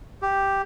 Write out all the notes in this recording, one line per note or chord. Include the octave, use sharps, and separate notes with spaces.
G4